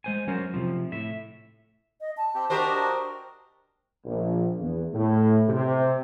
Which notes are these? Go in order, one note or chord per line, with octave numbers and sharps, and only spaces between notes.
G#3 C5 G#5
F#3 C#4 A#4 C5
C3 F3
A2 E5
D#5
A5
C4 G4
D4 F#4 G4 A#4 C5 D#5
A#1
E2
A2
C3